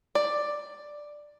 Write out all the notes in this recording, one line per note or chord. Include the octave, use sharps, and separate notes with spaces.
D5